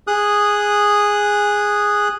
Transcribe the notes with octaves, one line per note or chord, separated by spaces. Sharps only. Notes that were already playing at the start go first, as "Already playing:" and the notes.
G#4 D#6 F#6